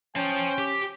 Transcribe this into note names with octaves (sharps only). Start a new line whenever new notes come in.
C#4 C5 G5 A5
G4